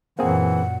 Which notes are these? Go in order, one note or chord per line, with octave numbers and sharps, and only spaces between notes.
F#2 A#2 E3 A#3 C4 G#4 F#5